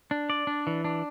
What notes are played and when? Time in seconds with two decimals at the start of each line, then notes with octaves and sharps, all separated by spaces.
0.11 D4
0.30 D5
0.47 D4
0.67 E3
0.85 D4